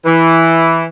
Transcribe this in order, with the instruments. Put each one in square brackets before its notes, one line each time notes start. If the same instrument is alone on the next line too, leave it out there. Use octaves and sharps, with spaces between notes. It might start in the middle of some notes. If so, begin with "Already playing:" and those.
[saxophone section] E3